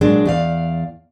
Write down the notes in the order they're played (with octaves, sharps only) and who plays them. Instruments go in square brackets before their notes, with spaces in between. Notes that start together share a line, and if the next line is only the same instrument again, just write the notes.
[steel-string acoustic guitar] A#2 F#3 G#3 D4
E2 D5 F5